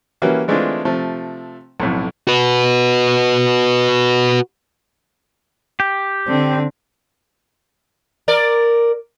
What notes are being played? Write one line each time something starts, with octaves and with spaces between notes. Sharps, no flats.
E3 G3 A#3 C#4 E4 F#4
E3 G#3 A3 C4 D4 F4
C3 F3 A3
B1 F2 A2
F#4 B4
G4
D3 C4
A#4 D5